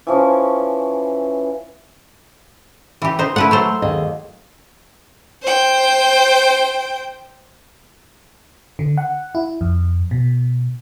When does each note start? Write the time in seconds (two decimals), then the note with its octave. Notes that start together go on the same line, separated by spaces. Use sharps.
0.07 E3 F3 C#4 C#6
3.02 E3 G4
3.19 D#4 C5
3.36 A3 E4 B4 F#5
3.51 F#3 A4 C5
3.82 D#2 G#4 D#5
5.42 C5 G5
8.79 D3
8.97 F#5
9.35 E4
9.61 F2
10.11 B2